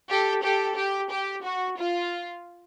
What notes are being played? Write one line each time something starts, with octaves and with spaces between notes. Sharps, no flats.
G4 A4
G4 A4
G4
G4
F#4
F4